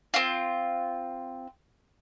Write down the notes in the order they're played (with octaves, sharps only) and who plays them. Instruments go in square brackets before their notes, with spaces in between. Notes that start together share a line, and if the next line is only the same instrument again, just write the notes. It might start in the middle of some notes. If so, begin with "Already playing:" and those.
[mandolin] C4 F4